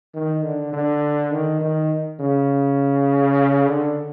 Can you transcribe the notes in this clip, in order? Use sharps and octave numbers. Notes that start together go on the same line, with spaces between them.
D#3
D3
D3
D#3
D#3
C#3
D3